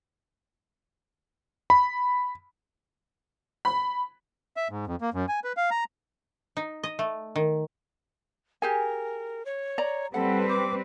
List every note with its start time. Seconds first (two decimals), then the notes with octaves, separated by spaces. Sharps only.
1.70 B5
3.65 B5
4.57 E5
4.70 G#2
4.87 F2
5.01 A#3
5.14 F#2
5.29 G#5
5.44 B4
5.57 F5
5.71 A#5
6.57 D#4
6.84 D#5
6.99 A3
7.36 D#3
8.62 G4 G#4 A#4 G#5
9.46 C#5
9.78 D5 A#5
10.14 G3 C4 A4 B4 F#5
10.49 C5 D6